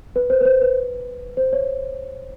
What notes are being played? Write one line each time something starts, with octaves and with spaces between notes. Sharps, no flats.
B4
C5
B4
C5
B4
C5
C#5